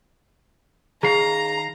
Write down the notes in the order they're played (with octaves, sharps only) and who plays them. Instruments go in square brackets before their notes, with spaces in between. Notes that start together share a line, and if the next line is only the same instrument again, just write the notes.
[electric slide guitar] D#3 F5 [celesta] G#4 [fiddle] A#5